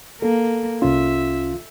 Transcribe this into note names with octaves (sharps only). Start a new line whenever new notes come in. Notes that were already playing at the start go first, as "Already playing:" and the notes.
A#3 A4
C2 C#4 F4 E5